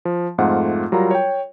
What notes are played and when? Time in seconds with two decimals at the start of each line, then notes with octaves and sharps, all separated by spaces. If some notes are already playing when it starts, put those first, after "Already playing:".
0.05 F3
0.38 F2 G#2 A3 F4 F#5
0.92 F#3 G3 F4 A#4 A#5
1.11 C#5 G5